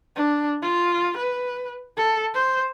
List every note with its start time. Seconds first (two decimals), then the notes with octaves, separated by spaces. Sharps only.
0.16 D4
0.62 F4
1.17 B4
1.97 A4
2.34 C5